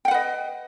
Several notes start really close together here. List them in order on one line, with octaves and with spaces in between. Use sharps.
G5 F#5 B4 D#5